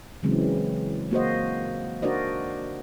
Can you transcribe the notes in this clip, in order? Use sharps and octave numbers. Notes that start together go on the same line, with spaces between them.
C#3 E3 F#3 G#3 C4
A#3 F#4 C5 D#5
D4 F#4 A#4 C5 D5 D#5